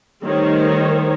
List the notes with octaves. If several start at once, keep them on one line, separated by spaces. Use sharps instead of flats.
D#3 G3 A3 C5 C#5